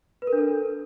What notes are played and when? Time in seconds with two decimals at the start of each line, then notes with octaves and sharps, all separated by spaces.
0.22 B4
0.27 A#4
0.33 D4
0.38 A4